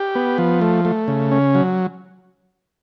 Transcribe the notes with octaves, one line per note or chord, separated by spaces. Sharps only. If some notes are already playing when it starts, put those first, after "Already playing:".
Already playing: G4
B3
F3
A3
A3
C#3
C#4
F#3